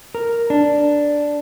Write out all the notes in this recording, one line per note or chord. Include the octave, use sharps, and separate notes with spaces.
A#4
D4